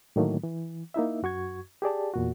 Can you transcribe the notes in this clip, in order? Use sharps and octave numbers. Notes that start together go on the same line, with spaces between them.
A2 D3 D#3 F#3 A3 A#3
E3
A#3 D#4 E4 E5
F#2 F#4 C#6 G#6
G4 G#4 D5 A5
E2 A#2 F#4